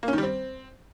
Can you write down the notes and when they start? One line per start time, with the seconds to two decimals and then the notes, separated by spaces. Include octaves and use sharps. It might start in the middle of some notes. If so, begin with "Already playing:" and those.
0.03 A#3
0.08 C#4
0.13 D#3
0.18 G3
0.23 C4